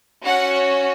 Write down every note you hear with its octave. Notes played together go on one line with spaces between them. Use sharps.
C#4 F#4 F#5